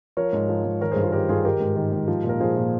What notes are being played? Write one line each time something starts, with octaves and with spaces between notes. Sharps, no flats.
F3 A#4 C#5
G#2
F3
G#2
D#3 A#4 C#5
G2 G#4 C5
F4 G#4
D#3 G4 A#4
G2 F4 G#4
D#3 G4 A#4
G#2
D#3
G#2
F3
A#2
A#4
F3 G#4 C5
A#2